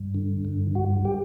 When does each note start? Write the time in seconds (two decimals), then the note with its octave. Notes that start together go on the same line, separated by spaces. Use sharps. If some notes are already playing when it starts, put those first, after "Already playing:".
Already playing: G2
0.14 D3
0.45 G2
0.75 G2 F#4
1.05 G4